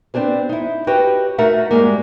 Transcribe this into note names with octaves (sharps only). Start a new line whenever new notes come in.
B3 C4 D4 G#4 C5
D#4 E4
F#4 G4 B4 C#5 D#5 G5
A3 D#4 F#4 A#4 E5 F#5
G#2 G3 G#3 A#3